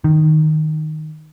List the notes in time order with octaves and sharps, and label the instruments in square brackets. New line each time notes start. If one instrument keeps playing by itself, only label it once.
[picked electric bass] D#3